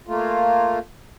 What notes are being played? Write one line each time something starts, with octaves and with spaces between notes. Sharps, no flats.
A3 A#3 F4